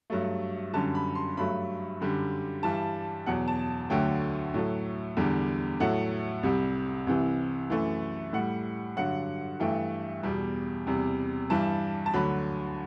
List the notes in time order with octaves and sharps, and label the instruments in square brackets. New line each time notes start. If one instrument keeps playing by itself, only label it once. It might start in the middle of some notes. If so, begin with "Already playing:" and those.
[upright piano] G2 F#3 A3
F#2 D3 G3 A5
B5
C6
G2 F#3 A3 B5
F#2 D3 G3
G2 E3 G3 A5
E2 B2 F#3 F#5
A5
D2 D3 F#3 A3 G5
A2 F#3 A3
E2 D3 G3
A2 F#3 A3 F#5
C2 C3 G3
C2 C3 E3
F#2 E3 A3
A2 G3 F#5
G2 D3 F#3 F#5
G2 E3 A3 G5
E2 B2 G3
E2 C3 G3
G2 E3 G3 A5
A5
D2 D3 F#3 B5